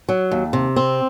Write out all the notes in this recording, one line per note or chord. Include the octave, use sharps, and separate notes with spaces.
F#3
D#2
C3
C4